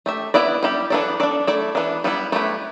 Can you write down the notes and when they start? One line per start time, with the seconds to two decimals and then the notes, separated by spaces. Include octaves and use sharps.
0.06 A3 G4 E5
0.34 B3 E4 B4 D5
0.63 G3 E4 G4
0.90 E3 B3 D4 A4 D5
1.20 D4 A4 D5
1.47 A3 E4 A4 D5
1.75 E3 B3 D4
2.04 G3 B3 E4
2.32 A3 E4 G4 B4